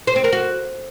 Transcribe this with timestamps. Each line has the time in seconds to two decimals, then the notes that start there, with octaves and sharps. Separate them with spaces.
0.07 C5
0.16 C4
0.24 A#4
0.33 F#4